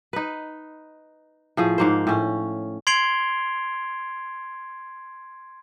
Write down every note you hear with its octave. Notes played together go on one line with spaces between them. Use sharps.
D#4 B4
A2 F3 G#4
G#2 A#3 C5
A2 C#4
C6 G#6 C7 D7 F7 G7